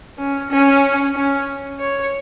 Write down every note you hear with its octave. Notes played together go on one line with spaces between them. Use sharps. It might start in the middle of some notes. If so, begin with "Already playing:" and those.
C#4
C#4
C#4
C#5